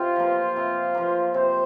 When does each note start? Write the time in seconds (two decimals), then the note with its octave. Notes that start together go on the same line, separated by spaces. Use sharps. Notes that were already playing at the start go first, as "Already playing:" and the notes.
Already playing: C3 F4
0.16 F3 A#3
0.56 C3
0.94 F3 A#3
1.34 C3 C5